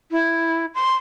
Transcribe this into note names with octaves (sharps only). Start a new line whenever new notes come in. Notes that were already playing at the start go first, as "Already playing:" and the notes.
E4
C6